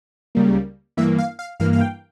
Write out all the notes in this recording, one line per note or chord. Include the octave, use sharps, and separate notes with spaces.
C#2 C#3 G3 A#3
G2 E3 A#3 E5
F5
F5
G2 E3 A#3 F5
F5
G5